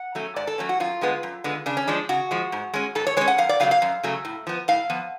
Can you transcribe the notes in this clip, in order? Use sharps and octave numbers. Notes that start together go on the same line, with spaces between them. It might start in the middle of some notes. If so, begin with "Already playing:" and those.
Already playing: F#5
F#3 A3 C#4
G#2 D5
A4
F#3 A3 C#4
F#4
F#2 F4
D3 G#3 B3
F#2
D3 G#3 B3
C#3 D4
C#4
F3 G#3 D4
C#3 F#4
F3 G#3
G#2
G#3 C#4
G#2 A4
C#5
G#3 C#4 C#5
F#5
F#2 F5
D5
C#3 F#3 A3 F5
F5
F#2
C#3 F#3 A3
A2
F3 B3
A2 F5
F3 B3